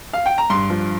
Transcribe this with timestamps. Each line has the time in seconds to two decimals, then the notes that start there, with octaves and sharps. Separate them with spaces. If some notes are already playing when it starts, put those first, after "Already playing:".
0.13 F5
0.26 G5
0.38 A#5
0.50 G2 C6
0.70 F3